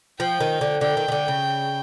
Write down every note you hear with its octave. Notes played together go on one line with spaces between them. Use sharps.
F3 G5
D#3
D3
D3 G5
D#3
D#3
D3
C#3